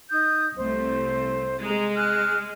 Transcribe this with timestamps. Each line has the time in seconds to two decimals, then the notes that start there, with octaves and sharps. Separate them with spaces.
0.10 D#4 D#6 G6
0.56 C2 A3 C5
1.63 G#3 A#5
1.96 G#5 F6 F#6